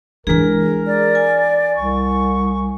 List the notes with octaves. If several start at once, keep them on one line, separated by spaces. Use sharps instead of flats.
E3 G#3 D4 G#4 A#4
D5
G#5
C2 C#6